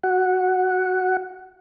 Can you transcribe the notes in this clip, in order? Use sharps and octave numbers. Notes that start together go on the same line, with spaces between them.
F#4 F#5